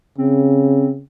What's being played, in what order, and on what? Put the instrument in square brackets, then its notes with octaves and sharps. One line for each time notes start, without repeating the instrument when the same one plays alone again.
[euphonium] C#3 [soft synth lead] C4